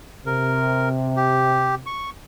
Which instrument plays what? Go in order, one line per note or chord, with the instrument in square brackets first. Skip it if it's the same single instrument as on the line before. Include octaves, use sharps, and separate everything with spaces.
[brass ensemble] C3 [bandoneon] A#4
[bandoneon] G4
C#6